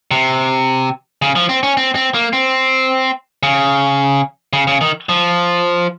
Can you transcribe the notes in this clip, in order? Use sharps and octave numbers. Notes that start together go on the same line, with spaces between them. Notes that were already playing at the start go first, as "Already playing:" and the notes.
C3
C#3
F3
C4
C#4
C4
C4
A#3
C4
C#3
C#3
C#3
D#3
F3